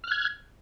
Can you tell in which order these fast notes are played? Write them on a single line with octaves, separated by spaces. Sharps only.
F6 F#6 G#6